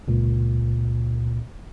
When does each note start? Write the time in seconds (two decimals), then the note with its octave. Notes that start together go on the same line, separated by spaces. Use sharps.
0.08 C#2 A#2